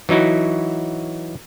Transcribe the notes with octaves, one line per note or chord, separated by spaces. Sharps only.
E3 F#3 D#4 E4 F#4